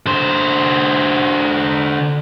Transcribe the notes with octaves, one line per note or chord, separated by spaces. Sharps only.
D3 C5